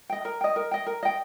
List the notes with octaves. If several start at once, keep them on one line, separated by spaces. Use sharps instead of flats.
D#5 G5
A#4
D#5 G5
A#4
D#5 G5
A#4
D#5 G5